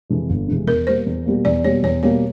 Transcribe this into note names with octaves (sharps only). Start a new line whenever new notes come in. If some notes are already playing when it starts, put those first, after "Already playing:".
F2 C3 E3 G#3
G1
F2 C3 E3 G#3
E2 A#4
B2 G3 A#3 C5
E2
B2 G3 A#3
E2 D5
B2 G3 A#3 C#5
E2 C#5
B2 G3 A#3 C#5